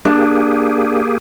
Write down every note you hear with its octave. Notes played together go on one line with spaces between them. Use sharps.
A#3 D4 G4 G#4